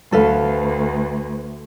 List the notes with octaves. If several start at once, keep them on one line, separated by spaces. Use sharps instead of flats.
D2 A4 B4 F5